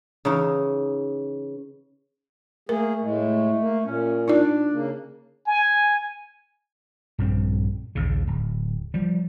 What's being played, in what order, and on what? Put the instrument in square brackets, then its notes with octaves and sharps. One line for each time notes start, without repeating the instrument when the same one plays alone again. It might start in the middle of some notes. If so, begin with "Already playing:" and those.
[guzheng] C#3 E3 D#4
[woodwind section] A3 [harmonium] A#3 G#4 [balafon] A#4
[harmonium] A2 G#3
A#3
[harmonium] A#2 [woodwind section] C#4
[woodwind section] D4 [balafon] D#4 F4 D5
[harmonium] C#3 A#3
[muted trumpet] G#5
[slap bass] A#1 G2 F3 C4
A#1 D#2 C#3
D1
F3 G3